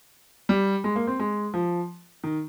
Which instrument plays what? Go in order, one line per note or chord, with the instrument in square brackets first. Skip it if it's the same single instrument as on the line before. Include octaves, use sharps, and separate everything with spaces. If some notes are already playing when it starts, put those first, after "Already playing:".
[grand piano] G3
G#3
A#3
C4
G#3
F3
D#3